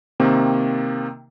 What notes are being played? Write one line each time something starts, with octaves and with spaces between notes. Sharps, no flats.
C3 D#3 A#3 C4